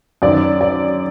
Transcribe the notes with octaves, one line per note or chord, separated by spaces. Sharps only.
F#2 D#3 D5
D5